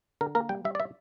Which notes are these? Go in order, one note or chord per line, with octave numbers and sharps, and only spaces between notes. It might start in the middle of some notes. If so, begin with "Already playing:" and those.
D3 A#4
A#3 A#4
G3 G5
G3 E5
D5
E5